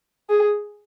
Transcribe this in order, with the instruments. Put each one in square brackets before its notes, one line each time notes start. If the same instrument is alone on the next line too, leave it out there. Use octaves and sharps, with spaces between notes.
[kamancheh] G#4